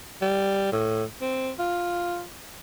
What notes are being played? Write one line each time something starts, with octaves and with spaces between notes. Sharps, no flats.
G3
A2
C4
F4